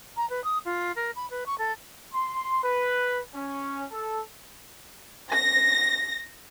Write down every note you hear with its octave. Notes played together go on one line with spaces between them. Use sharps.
A#5
B4
D#6
F4
A#4
B5
B4
C#6
A4
C6
B4
C#4
A4
A#6